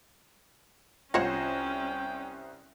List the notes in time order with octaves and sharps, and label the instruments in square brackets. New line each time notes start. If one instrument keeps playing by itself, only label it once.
[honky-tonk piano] C2 C5 A#6 [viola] C#4 [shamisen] F4 C#5 F#5 [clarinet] G5